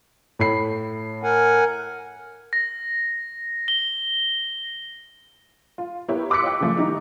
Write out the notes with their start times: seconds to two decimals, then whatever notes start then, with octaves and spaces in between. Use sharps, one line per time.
0.39 A2 B5 C7
1.23 A#4 F#5 G#5
2.53 A#6
3.68 G7
5.78 F4
6.08 B3 E4 G4 A#4 B4 C#5
6.30 C6 D6 E6 F#6 B6 C#7
6.42 F4 C#5 D#5 G5
6.60 C#3 F3 A3
6.77 D#3 G3 D#4 E4 G4